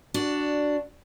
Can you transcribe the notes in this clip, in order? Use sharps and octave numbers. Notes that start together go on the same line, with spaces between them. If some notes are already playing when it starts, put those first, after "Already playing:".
D4 F#4